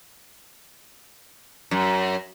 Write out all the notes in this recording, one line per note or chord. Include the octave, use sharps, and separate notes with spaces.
F#2